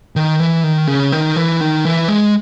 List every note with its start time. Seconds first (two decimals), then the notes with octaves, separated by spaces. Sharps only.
0.16 D#3
0.40 E3
0.64 D#3
0.87 C#3
1.12 D#3
1.36 E3
1.61 D#3
1.85 E3
2.08 G#3